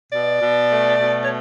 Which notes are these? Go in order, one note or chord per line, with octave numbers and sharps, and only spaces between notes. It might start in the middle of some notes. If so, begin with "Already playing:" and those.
B2 D5
B2
A3
B2
C#5